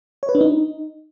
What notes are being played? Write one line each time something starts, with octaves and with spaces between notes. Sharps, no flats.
C#5
B4
D4
D#4